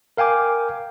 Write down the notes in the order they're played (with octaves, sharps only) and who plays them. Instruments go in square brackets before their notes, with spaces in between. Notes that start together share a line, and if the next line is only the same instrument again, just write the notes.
[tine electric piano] A#4 F5 G5 G#5 D6